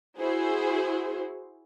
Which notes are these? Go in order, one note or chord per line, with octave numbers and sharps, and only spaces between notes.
E4 F#4 G#4 C5